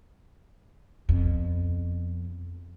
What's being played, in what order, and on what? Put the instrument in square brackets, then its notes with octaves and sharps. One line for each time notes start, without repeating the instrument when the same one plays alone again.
[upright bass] F2 B2